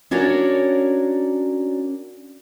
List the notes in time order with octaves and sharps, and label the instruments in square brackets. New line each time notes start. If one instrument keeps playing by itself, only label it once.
[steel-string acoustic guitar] C#4 D4 F#4 A#4 C#5 D5